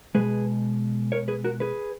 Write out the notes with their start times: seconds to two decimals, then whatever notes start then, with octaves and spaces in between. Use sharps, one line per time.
0.15 B2 G#3 G#4 B4
1.12 A#4 C#5
1.28 G#4 B4
1.44 F#4 A#4
1.60 G#4 B4